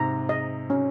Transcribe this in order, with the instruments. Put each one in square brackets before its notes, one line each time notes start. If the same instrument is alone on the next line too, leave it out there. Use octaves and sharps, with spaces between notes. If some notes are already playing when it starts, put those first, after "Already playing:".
Already playing: [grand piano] G#2 C3 [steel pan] A#5
[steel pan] D#5
C#4